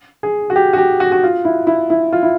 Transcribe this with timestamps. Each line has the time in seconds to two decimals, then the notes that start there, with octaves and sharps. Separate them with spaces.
0.23 G#4
0.50 F#4
0.56 G4
0.73 F#4
0.78 G4
1.00 F#4
1.12 F#4
1.23 F4
1.45 E4
1.67 E4
1.90 E4
2.13 F4
2.23 E4